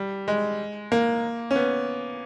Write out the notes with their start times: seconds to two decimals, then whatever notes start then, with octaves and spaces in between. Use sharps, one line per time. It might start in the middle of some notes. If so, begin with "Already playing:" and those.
Already playing: G3
0.28 G#3
0.92 A#3
1.51 C#4
1.56 B3